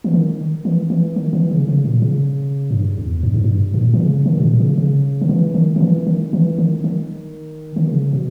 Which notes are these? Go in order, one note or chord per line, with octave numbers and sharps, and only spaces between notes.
E3
D#3
E3
E3
D#3
E3
C#3
C#3
A#2
C#3
G2
E2
G2
G#2
G2
A#2
D#3
C#3
D#3
B2
A#2
C#3
C#3
D#3
E3
D#3
D#3
E3
D#3
E3
D#3
D#3
D#3
C#3
B2